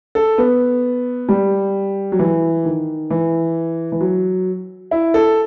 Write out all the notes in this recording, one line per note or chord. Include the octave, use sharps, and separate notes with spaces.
A4
B3
G3
F#3
E3
D#3
E3
E3
F#3
E4
A4